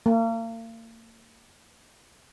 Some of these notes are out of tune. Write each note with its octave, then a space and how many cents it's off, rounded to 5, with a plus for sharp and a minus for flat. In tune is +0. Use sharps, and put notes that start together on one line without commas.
A#3 -40